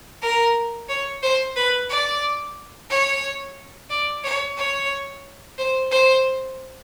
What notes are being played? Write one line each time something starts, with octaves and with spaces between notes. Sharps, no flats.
A#4
C#5
C5
B4
D5
C#5
D5
C#5
C#5
C5
C5